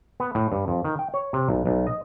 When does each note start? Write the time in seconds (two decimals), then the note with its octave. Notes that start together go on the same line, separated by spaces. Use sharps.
0.20 B3
0.35 A2
0.52 G2
0.68 F2
0.84 D#3
0.99 G5
1.14 C#5
1.33 C3
1.49 B1
1.66 B1
1.87 D#5